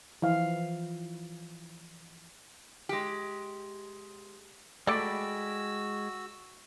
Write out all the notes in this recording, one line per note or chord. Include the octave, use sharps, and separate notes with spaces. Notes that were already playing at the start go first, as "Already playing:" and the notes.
E3 F3 F5
G#3 G4
G#3 A3 F#4 A4 D5 G5 B5 E6